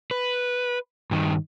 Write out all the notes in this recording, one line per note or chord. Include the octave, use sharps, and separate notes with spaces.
B4
G2 D#3